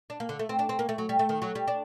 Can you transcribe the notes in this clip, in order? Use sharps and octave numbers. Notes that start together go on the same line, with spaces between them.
D4
A#3
D3
A3
C4
D4
C4
A#3
A3
F#3
G3
A3
D#3
F#3
G3
D4